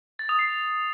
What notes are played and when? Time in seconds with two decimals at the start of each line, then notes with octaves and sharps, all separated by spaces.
0.19 A6
0.29 D#6
0.39 C7